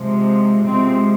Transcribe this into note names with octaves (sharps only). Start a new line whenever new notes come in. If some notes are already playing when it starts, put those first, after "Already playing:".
Already playing: C3 F3 G#3
C3 F3 G#3 C4